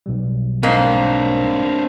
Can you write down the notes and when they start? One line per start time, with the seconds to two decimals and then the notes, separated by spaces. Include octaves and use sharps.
0.06 B1 B2 G3
0.63 G#2 A#3 C4 D4